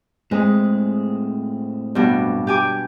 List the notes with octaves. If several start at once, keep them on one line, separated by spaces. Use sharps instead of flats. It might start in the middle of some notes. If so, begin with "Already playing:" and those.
A2 G#3 C4 G#4
G2 B2 D4
G4 G#5 D6